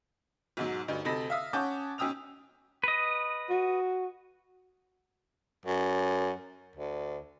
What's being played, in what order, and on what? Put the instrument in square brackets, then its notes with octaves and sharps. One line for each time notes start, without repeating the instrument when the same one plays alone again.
[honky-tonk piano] B1 G#2 F#3
D2 G2 D#4
D2 C3 A4 D#5 B5 A#6
E5 F5 D#6
C#4 C#5 F#5 A5 D6 G6
B1 C#4 G5 D#6 E6 F7
[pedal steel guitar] B4 D#5
[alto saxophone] F#4
[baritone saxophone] F#2
D2